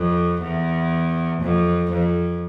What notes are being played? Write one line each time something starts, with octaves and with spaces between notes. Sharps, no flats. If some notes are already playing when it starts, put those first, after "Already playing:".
Already playing: F2
E2
F2
F2